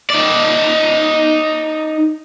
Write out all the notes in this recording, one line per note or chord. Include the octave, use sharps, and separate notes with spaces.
D#4 D5